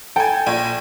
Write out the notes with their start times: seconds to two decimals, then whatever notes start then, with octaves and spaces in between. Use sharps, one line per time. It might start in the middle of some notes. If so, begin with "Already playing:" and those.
0.16 A4 G5 G#5
0.46 A#1